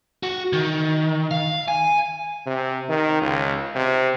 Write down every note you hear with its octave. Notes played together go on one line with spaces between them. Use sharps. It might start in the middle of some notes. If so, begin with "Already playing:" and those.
F#4
D#3
F5
G#5
C3
D#3
C#2
C3